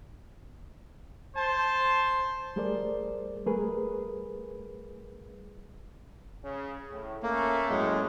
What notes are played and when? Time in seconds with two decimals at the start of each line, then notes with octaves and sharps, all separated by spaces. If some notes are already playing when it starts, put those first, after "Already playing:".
1.37 C5 A5
2.56 G3 A3 G#4 A#4 C5 D5
3.46 G3 A3 G#4 A#4 B4
6.44 C#3
6.91 A2
7.23 A3 A#3 C#4
7.70 F#2 A2 G#3